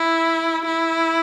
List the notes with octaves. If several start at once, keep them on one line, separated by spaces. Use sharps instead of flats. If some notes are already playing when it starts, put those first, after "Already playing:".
Already playing: E4
E4